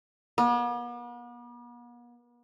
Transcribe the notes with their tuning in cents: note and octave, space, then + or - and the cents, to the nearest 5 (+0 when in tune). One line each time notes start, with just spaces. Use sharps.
B3 -45